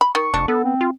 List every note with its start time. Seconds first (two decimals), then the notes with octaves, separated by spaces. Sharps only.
0.01 B5
0.15 D#3 C#6
0.34 F1 D4
0.48 B3 A4
0.64 C4
0.81 F4